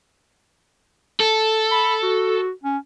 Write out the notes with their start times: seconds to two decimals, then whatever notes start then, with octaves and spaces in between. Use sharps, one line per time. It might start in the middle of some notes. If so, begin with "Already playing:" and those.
1.20 A4
1.71 B5
2.03 F#4
2.63 C#4